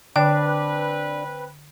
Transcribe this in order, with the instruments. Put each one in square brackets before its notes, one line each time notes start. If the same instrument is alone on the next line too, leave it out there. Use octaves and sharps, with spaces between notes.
[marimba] D3 [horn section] C4 B4 [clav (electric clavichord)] D4 [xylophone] G5